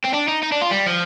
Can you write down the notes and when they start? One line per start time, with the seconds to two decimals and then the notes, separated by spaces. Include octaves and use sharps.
0.05 C4
0.14 D4
0.28 D#4
0.43 D#4
0.52 D4
0.62 F4
0.71 G3
0.86 F3